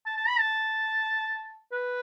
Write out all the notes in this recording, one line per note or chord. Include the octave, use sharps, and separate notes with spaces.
A5
A5
B5
A5
B4